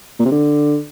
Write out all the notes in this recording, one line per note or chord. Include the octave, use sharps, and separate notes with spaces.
A#2
C3
D3